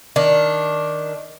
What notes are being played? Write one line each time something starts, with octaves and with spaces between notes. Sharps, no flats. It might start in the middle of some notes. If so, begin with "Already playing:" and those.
D#3 D4